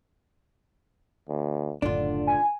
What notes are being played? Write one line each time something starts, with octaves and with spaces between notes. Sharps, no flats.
D2
F#1 A2 D3 D4 F4
G#5